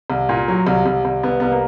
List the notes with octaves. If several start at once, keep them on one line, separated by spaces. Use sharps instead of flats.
C2
A#2
F#3
C2
C2
C2
C2 B3
C2 B3
A#3